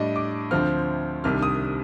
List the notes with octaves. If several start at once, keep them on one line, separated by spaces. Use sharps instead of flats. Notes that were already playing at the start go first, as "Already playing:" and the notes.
Already playing: A2 G3 D4 D#5
D6
D2 D3 F3 C4 F6
C2 C3 D#3 G3 D4 F6
D#6